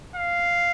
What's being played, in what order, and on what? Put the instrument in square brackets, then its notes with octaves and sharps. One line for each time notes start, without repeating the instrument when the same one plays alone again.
[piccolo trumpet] F5